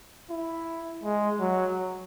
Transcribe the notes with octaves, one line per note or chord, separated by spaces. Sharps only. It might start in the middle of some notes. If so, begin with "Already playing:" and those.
E4
G#3
F#3